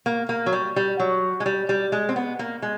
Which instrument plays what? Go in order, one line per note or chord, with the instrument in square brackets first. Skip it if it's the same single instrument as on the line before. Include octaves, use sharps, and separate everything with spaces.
[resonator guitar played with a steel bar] A#3
A#3
F#3
G3
G3
F#3
G#3
G3
G3
G#3
C4
B3
A#3
G#3